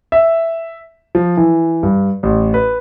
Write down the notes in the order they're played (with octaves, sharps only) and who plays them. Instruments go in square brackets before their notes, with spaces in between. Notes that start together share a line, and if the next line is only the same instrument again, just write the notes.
[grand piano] E5
F3
E3
G2
A1
B4